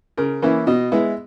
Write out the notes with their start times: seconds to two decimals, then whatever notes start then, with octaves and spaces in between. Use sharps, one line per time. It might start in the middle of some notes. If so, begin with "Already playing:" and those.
0.17 C#3 A#4
0.42 E3 A#3 C#4 E4
0.67 B2 D#5
0.92 G#3 B3 E4